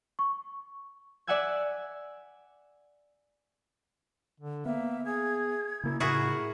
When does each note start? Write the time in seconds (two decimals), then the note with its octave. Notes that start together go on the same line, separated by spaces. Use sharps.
0.19 C#6
1.27 D5 E5 F#5 G#5 E6 G#6
4.40 D3
4.65 A#3 B3 E5
5.06 G#4 G#6
5.83 C#3 A#3 E4
6.00 A2 C#3 E4 F#4 G#4 A#4 B5